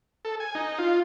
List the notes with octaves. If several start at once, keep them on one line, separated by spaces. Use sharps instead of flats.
A4
G#5
D#4
F4